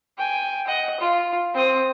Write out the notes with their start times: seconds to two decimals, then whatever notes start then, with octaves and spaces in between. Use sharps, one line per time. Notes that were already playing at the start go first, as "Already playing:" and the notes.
0.18 G5 G#5
0.67 D#5 F#5
1.00 F4
1.54 C4 D#6